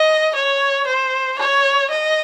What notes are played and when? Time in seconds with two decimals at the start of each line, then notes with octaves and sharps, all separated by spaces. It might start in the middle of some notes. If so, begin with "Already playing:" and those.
Already playing: D#5
0.35 C#5
0.87 C5
1.39 C#5
1.91 D#5